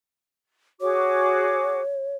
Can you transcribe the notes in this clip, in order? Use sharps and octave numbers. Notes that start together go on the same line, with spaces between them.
F#4 G#4 C#5 D6